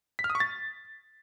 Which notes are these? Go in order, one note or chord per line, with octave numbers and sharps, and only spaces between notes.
B6
F6
D#6
C#6
A6